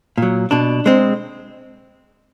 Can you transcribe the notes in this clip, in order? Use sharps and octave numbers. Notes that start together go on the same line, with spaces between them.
A#2 F#3
B2 D4
G#3 C4